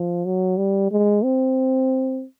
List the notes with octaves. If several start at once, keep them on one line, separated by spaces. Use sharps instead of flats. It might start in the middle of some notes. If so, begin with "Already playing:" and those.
Already playing: F3
F#3
G3
G#3
C4